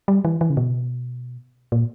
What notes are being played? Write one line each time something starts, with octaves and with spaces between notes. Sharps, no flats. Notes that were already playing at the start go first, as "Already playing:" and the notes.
G3
E3
E3
C#3
B2
A#2